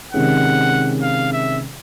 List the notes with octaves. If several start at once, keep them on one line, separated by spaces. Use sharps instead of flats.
C3 D#3 G#3 C#4 F#5
F5
E5